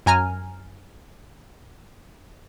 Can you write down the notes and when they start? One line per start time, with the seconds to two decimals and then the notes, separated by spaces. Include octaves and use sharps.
0.06 F#2 G#5 A#5 F6